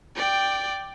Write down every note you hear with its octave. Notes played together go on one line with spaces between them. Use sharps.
D5 G5